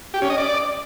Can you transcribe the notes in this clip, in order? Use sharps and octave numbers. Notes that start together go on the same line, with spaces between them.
G4
C#4
D#5
D5